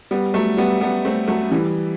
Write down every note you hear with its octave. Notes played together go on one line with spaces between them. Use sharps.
G3 B3
F#3 A3
G3 B3
G3 B3
A3 C4
F#3 A3
E3 G3